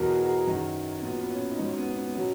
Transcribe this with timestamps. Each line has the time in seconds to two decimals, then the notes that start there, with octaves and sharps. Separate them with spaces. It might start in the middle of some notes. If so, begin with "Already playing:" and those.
Already playing: E2 B2 F#3 A#4
0.09 G#4
0.22 F#4
0.27 G#4
0.47 F#2 D#3 F#3 F#4
1.02 A#2 F#3 B3
1.22 B3
1.30 C#4
1.51 D#4
1.59 G#2 F#3 C#4
1.78 B3
1.96 B3
2.15 B2 F#3 C#4